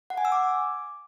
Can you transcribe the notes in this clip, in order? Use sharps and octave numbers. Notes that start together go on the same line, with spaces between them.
F#5
G#5
E6
D6